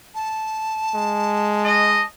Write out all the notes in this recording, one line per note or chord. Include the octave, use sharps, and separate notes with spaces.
A5
G#3
D#5